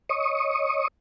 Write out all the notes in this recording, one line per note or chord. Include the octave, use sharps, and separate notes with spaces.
C#5 D#5 C#6 D#6